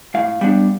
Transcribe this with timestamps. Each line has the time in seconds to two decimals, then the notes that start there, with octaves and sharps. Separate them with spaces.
0.15 A2 F5
0.41 G3 B3 D4